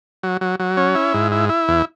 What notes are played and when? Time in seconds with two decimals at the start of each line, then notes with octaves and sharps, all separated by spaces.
0.23 F#3
0.41 F#3
0.60 F#3
0.77 C#4
0.95 E4
1.14 G#2
1.32 E4
1.49 E4
1.68 E2